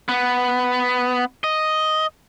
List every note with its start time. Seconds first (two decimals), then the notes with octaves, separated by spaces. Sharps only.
0.09 B3
1.44 D#5